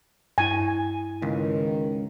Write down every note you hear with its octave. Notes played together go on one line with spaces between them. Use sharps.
G2 E4 G#5
C#2 D#3